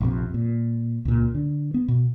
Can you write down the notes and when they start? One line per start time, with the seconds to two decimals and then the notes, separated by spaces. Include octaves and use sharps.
0.01 A#1 F2 C3
0.34 A#2
1.05 C#2 A#2
1.35 D3
1.74 B3
1.88 B2